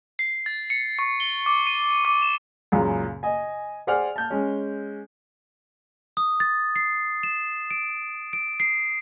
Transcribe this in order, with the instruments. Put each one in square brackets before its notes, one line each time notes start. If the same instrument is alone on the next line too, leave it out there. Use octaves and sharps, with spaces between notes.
[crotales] C7
A6
C#7
C#6
G7
D6
D#7
D6
E7
[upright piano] C#2 F#2 A#2 C#3
D#5 G#5
G#4 C5 D5 F#5 G#5 F6
A5 G6
G#3 C#4
[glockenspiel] D#6
A6
C7
E7
D7
D7
C7